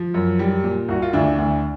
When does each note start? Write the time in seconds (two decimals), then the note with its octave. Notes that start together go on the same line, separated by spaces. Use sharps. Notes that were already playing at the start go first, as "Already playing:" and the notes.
Already playing: F3
0.14 F#2
0.39 G3
0.64 A#2
0.88 C2 F#4
1.02 F4
1.13 D2 D4 E4
1.38 D2